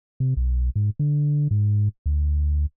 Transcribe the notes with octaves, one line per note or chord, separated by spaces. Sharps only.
C3
B1
G#2
D3
G#2
D2